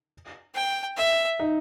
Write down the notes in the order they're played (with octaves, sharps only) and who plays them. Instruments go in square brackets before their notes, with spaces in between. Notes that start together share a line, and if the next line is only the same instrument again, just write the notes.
[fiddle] G5
E5
[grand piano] D#4